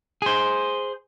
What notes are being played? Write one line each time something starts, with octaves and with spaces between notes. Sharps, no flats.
G#4 C5